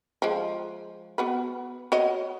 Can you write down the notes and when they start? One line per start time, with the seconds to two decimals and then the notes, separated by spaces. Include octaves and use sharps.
0.22 F3 G#3
1.18 B3 F#4 B4
1.92 F#4 C#5 D#5